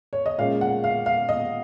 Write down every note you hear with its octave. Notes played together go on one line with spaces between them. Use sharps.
C#5
D#5
A#2 G#3 C#4 F5
F#5
F5
F5
D#5